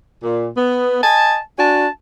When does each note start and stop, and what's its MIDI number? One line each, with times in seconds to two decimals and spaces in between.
0.23 0.49 46
0.57 1.00 59
1.03 1.37 75
1.03 1.37 80
1.03 1.37 81
1.58 1.87 62
1.58 1.87 66
1.58 1.87 80
1.58 1.87 81